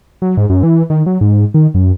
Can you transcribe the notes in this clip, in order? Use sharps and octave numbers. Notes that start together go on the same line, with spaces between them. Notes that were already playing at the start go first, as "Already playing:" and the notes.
F#3
G#2
F#2
E3
D#3
F#3
G#2
D#3
F#2